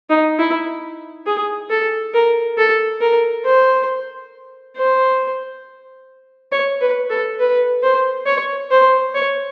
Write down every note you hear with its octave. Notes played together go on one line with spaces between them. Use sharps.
D#4
E4
G#4
A4
A#4
A4
A#4
C5
C5
C#5
B4
A4
B4
C5
C#5
C5
C#5